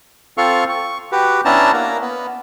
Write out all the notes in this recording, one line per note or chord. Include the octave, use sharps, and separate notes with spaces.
C4 F4 A4 F5 C#6
C#6
F#4 G4 B4
B3 C#4 D4 E4 A5 A#5
A#3 A#4
B3